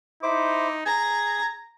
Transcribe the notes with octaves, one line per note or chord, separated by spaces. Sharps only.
D#4 E4 C5 D6
G#4 A#5 G#6